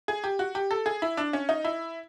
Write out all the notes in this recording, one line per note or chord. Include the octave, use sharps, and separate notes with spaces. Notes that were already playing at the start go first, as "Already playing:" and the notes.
G#4
G4
F#4
G4
A4
G#4
E4
D4
C#4
D#4
E4